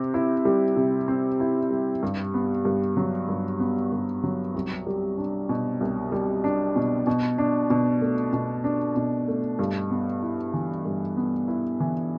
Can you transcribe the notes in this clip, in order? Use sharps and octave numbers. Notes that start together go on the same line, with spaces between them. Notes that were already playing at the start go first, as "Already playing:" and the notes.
Already playing: C3 C4
E4
G3
C3
C4
E4
G3
G2
B3
G2
F#3
G2
B3
G2
F#3
C2
G3
D4
B2
C2
G3
D4
B2
B2
D4
B2
A3
B2
D4
B2
A3
G2
B3
E4
E3
G2
B3
E4
E3